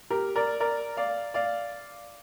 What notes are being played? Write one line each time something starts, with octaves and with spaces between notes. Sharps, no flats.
G4 A#4
A#4 D5
A#4 D5
D5 F5
D5 F5